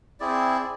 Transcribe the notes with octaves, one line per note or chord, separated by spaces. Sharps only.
C4 E4 G#4 D5